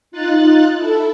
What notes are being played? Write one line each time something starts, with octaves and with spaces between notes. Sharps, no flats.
D#4 F4 F#6 A6
E4 A4